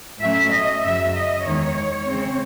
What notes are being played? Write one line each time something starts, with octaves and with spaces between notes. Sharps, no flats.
A2 F#3 C#4 E5
D#5
F#2 C#3 F#3 E5
D#5
E2 D#3 G#3 C#5
C#3 G#3 C4